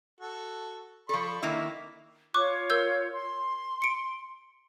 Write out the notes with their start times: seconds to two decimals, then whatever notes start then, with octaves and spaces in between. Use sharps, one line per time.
0.21 F#4 A4
1.09 F3 A4 D5 B5 C#6
1.42 D3 D#3 A#3 E4
2.34 F4 C#5 C#6 D6 F#6
2.70 A#4 E6 G6
3.12 C6
3.82 C#7 D7